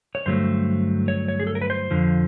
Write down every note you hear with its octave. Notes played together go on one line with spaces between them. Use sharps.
C#5
G2 D3 F#3 A3 C5
C#5
C#5
G#4
A4
A#4
B4
C5
F2 D3 F3